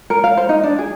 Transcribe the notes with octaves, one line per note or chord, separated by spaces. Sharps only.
A#4
F5
C5
D#4
D4
G#4